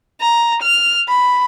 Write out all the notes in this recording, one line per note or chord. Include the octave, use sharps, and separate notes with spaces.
A#5
F6
B5